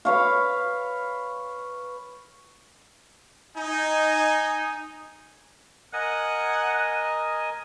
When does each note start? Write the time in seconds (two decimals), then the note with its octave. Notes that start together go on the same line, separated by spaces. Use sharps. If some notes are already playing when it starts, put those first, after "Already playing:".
0.05 B4 C#5 F5
3.56 D#4 G#5
5.93 A#4 D#5 F#5 G#5